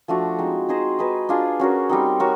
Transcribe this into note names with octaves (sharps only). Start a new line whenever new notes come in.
F3 A3 D4 F#4
G#3 C4 D#4
D#4 G#4 C5 D#5
D#4 G#4 B4 D#5
D4 F4 G#4
C#4 F#4 A#4
G3 C4 D#4
F#4 A#4 C#5